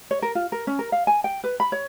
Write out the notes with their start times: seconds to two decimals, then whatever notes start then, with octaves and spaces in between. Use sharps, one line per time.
0.11 C#5
0.22 A#4
0.35 F4
0.52 A#4
0.67 C#4
0.79 A#4
0.92 F5
1.07 G#5
1.24 G5
1.44 B4
1.60 B5
1.72 C#5